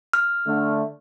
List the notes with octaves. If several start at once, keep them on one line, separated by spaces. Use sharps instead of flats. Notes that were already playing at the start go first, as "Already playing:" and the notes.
F6
D3 A3